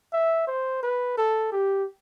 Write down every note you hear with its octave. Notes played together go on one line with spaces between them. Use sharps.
E5
C5
B4
A4
G4